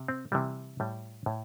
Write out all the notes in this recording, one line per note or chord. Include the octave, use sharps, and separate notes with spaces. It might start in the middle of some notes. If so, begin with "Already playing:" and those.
Already playing: C3
C4
C3 E3 G3
A2 G3
A2